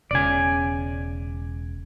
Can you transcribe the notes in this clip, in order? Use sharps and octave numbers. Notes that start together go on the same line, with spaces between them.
E1 C#3 D5 G#5